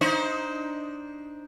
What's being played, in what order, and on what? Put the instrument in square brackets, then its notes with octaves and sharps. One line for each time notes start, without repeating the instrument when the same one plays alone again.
[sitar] D4 D#4 C5